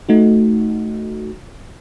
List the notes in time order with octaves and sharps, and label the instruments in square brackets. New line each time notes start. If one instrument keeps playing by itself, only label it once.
[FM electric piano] A3 D#4 F#4